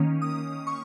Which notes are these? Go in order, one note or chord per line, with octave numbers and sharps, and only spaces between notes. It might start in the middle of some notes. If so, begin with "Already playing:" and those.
Already playing: D#3 A#3 C#4
D#6
C#6